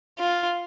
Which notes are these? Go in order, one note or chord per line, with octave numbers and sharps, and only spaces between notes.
F4